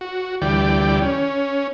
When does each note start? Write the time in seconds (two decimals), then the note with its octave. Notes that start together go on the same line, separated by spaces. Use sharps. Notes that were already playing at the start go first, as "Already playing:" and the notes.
0.01 F#4
0.41 D2 E3 G3 D5 G5
1.02 C#4